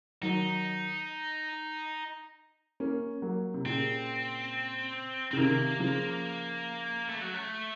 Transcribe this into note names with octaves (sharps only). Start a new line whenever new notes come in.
D#3 F#3 D#4
A#3 C#4
F#3 A#3
C3
A#2 C#3 C4
C#3 C4
C3 D#3 A#3
C#3 F3
A3
F#3
A3